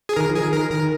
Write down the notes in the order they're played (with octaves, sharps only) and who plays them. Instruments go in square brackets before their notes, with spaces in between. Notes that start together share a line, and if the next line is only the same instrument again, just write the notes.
[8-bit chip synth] G#4
[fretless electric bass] D#3 [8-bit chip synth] A#4
[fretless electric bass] F3
[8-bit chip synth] G#4
[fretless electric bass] D#3
[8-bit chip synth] A#4
[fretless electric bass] D#3 [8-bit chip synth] A#4